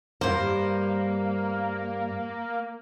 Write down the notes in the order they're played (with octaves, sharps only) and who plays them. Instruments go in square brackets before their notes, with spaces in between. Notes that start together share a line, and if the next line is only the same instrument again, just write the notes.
[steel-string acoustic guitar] G2 C5 [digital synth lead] A#3